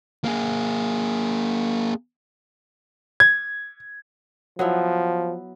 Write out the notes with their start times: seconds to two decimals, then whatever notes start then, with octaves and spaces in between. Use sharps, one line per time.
0.24 A#3 G#4
3.20 G#6
4.59 F3 F#3 B3 E4